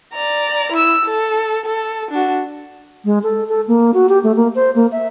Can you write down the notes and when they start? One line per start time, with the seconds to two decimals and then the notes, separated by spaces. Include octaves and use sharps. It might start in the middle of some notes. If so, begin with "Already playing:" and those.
0.14 D5 A#5
0.72 E4 E6
1.06 A4
1.66 A4
2.11 D4 F#4
3.05 G#3
3.23 A4
3.49 A4
3.68 A#3
3.94 F#4
4.09 G4
4.23 A3
4.36 A#3
4.55 C5
4.75 A#3
4.92 E5